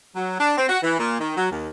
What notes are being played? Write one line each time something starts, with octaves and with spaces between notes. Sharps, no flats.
F#3
D4
C4
F#4
E3
A#2
D#3
F#3
D#2